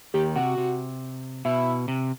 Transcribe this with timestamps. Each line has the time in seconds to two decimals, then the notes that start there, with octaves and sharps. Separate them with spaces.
0.14 D#2 D#3 G4
0.36 C3 F#4
0.58 C3
1.45 B2 E4
1.88 C3